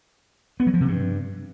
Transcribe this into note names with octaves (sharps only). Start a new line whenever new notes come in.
B3
F#3
F3
C3
G2